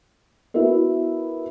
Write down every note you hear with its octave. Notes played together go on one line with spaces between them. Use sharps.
B3 E4 F#4 A#4 E5